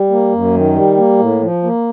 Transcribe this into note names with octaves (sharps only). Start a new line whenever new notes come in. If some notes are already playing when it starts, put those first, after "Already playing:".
Already playing: G3
A#3
F#2
D#3
G3
A#3
A2
F3
A#3